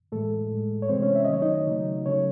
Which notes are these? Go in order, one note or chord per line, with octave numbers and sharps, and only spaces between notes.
A2 E3 G#3 A3 A4
A2 G#3
C#5
C3 E3 G#3 C4 C5
C#4 C#5
E5
D#5
D#3 F#3 A3 C#5
D#4 D#5
C#3 F#3 A3
C#3 F#3 A3 C#4 C#5